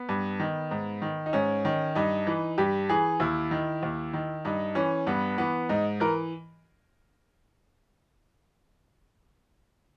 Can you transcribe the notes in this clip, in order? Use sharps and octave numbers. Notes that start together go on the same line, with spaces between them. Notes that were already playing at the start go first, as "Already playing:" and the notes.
Already playing: B3
G2
D#3
G#2
D#3
D#4
G#2 C#4
D#3
G2 D#4
E3
G2 G4
E3 G#4
D#2 E4
D#3
D#2
D#3
G2 D#4
E3 C#4
G2 B3
E3 B3
G#2 D#4
E3 A#4